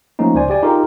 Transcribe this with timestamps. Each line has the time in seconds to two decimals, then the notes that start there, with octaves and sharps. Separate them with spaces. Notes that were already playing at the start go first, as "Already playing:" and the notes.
0.19 F3 A3 A#3 C#4 D#4
0.35 C#2 C5 D5 G#5
0.50 G4 D5 G#5
0.63 D#4 F4 G4 G#4 A#4